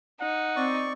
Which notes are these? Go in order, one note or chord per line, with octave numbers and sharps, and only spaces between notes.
D#4 F#5
C4 D5 C#6